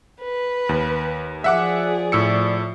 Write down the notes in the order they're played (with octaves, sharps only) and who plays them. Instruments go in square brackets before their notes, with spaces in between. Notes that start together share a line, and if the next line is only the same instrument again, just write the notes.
[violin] B4
[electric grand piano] D#2
[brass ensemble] F3 D5 [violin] G#4 [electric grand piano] E5 F#5 D6
[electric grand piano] A2 E6 C#7